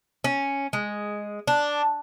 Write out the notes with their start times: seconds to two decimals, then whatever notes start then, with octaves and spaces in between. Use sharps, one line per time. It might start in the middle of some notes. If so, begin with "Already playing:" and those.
0.24 C#4
0.73 G#3
1.47 D4